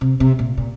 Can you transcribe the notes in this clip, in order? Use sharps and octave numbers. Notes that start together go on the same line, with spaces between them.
C3
C3
A#2
A#2